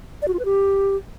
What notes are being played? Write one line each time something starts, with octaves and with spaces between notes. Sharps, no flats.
D5
F#4
F4
B4
G4